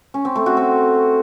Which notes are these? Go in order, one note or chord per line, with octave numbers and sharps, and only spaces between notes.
C#4
C4
A3
F#4
C4